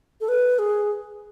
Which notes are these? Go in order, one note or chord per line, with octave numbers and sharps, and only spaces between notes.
A4
B4
G#4